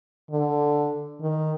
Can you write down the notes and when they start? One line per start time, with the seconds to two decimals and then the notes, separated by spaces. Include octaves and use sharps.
0.31 D3
1.21 D#3